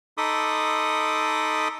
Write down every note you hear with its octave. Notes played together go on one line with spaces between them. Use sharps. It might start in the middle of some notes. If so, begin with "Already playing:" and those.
D#4 A4 B5 C6 D6 D#6